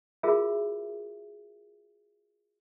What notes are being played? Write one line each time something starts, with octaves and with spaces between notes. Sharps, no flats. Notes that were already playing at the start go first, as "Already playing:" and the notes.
F4 F#4 G#4 A#4 E5